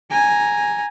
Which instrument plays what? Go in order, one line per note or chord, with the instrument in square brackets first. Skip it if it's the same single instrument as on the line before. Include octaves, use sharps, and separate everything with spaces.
[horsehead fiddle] G#5 A#5